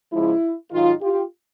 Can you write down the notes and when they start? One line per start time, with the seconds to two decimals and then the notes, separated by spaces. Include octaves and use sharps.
0.12 C#3 F3 G#3 E4
0.71 G#2 D#3 F#3 D#4 F4
1.01 F4 G4